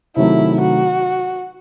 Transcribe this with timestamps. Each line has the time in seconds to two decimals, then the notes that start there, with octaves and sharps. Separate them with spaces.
0.16 C3 D#3 F#3 A3 E4
0.60 F#4